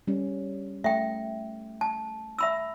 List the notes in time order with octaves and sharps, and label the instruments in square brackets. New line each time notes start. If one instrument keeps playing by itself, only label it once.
[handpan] G3 C#4
[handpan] A3 [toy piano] E5 G5
[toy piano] A5
E5 B5 E6